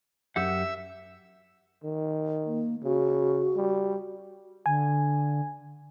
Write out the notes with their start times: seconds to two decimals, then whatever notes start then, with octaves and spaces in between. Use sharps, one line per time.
0.36 F#2 G4 E5 F#5
1.84 D#3
2.45 A#3
2.84 C#3 F#4
3.56 G3
4.66 D3 G#5